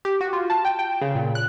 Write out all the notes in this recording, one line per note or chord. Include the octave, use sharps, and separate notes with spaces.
G4
F#4
F4
A5
G5
G5
C#3
A#2
F#6